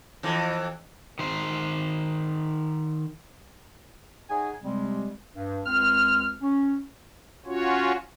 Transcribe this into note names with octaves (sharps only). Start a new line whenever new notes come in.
F2 E3
D#3 C5
D#4 G#4 C#5 D#5 F#5 G#5
C3 G3 G#3 C4
G2
C#2 C4 F6
C#4
C#4 F4 F#4 C#5